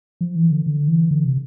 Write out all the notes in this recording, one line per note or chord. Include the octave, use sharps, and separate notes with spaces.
F3
E3
D3
D3
E3
D3
C3